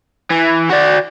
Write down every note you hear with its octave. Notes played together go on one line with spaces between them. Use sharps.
E3
F#4 D5